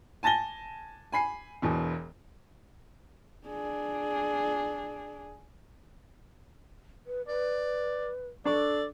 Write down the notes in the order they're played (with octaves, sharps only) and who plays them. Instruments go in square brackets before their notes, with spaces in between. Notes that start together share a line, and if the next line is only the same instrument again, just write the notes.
[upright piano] G#5 A5 A6 A#6 G7
G#5 B5 C7
E1 E2 B2
[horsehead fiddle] D4 G#4
[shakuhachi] B4
[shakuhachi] B4 [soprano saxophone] D5
[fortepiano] D4 C#6 D6 [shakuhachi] A4 [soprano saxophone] D5